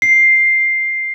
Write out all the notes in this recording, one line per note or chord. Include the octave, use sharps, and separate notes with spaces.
C7